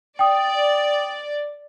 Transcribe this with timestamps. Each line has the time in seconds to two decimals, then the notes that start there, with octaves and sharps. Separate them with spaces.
0.19 D5 G5 D#6